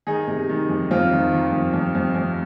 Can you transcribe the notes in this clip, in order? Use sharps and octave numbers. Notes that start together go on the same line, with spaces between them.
D#3 D#4 G#4
C3
D#3
F2
F2 C4 F4
D#3
D#3
F2
F2
F2
F2